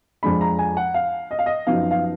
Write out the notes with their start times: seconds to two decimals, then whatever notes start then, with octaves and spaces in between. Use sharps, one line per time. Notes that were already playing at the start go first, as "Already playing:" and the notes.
0.23 F2 F3 G#3 D4 B5
0.41 A#5
0.59 G#5
0.77 F#5
0.94 F5
1.31 D#5
1.39 F5
1.46 D#5
1.67 F#2 F3 B3 D#4 F5
1.91 F5